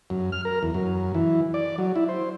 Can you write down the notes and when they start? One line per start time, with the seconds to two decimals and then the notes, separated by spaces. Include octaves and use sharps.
0.10 F#2
0.32 F6
0.45 A#4
0.63 E2
0.74 F#2
1.15 E3
1.54 D5
1.78 F#3
1.96 E4
2.08 C5